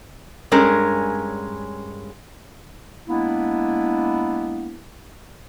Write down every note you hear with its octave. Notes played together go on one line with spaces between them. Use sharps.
G2 G#3 C#4 A#4
G#3 A#3 B3 D4 E4